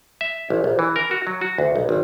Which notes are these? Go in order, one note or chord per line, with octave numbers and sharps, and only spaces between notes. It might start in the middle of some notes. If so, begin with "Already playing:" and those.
E5
A1
A#1
E3
A#4
F#4
F#3
F#4
D2
B1
G#1